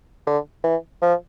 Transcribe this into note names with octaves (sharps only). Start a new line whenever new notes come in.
D3
E3
F3